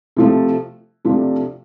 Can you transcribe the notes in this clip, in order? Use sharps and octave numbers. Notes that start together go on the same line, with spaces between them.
C3 F3 A3
C3 F3 A3 D4